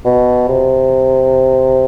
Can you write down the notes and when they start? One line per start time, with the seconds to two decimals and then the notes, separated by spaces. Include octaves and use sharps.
0.05 B2
0.49 C3